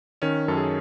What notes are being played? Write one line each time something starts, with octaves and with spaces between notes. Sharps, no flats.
D#3 C#4
F#2 A4
G#4